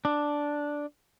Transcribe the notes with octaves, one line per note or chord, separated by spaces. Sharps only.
D4